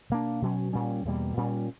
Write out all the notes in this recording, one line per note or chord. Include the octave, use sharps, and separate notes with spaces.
B2 A#3 D4
B2 F#3 C#4
A#2 G3 C#4
E2 B2 G3 A#3
A#2 G3 C#4